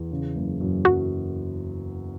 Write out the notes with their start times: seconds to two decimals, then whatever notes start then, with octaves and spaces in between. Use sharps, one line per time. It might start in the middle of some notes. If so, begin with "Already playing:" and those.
Already playing: E2
0.11 C#3
0.35 F#1
0.60 F#2
0.85 F#2 F#4